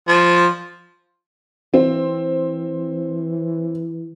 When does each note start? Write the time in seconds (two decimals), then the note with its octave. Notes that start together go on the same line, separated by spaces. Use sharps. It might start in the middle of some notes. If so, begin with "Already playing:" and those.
0.08 F3
1.74 E3 C4